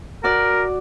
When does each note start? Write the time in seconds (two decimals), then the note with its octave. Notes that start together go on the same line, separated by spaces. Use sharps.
0.24 F#4 A#4 D5